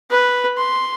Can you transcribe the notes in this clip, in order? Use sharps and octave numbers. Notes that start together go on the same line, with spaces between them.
B4
C6